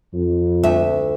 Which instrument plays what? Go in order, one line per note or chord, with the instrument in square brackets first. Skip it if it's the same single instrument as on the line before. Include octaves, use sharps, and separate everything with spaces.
[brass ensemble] F2
[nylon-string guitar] D2 E5